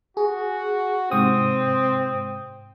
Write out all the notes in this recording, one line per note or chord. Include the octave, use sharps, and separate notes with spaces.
F#4 G#4
G#2 C3 C4 D#6